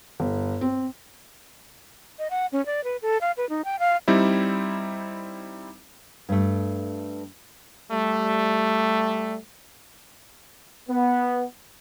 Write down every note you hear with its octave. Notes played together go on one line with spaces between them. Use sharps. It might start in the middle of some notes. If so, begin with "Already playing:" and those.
G1
C4
D#5
F#5
C#4
D5
B4
A4
F5
B4
D#4
G5
F5
G3 C4 D#4 E4
G2 A3
G3 A3
B3